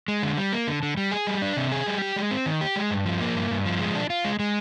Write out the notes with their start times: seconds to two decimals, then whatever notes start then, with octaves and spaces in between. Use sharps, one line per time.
0.08 G#3
0.23 D3
0.38 G3
0.53 A#3
0.67 D3
0.83 D3
0.97 G3
1.12 G#4
1.27 G3
1.42 D4
1.57 C3
1.72 G#4
1.86 G3
2.02 G4
2.16 G#3
2.31 C4
2.46 D#3
2.61 G4
2.76 G#3
2.91 G2
3.05 F3
3.20 A#3
3.35 G2
3.51 G2
3.65 F3
3.80 G#3
3.95 D4
4.10 F4
4.25 G#3
4.39 G#3